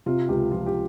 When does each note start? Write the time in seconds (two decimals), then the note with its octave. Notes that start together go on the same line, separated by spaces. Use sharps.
0.06 C3 F4
0.29 C#2 G4
0.51 F3 F4
0.66 G4